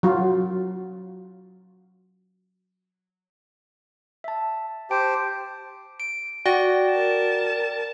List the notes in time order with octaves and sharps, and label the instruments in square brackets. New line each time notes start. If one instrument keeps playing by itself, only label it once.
[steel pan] F#3 F4
[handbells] E5 A5
[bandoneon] G4 C5 [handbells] G5 A5 D7
[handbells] D7
[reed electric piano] F#4 [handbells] D5 G5 A#6
[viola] A#4 A5